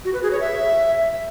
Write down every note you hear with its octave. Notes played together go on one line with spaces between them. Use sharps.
F#4
B4
G#4
C#5
E5